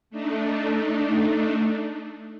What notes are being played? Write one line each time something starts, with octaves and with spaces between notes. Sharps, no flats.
A3 D4 D#4